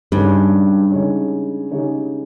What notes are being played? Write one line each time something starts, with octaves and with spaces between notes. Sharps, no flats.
G2 C#3 G#3 D#4 G4 C#5
C#3 G#3 D#4 G4 C#5
C#3 G#3 D#4 G4 C#5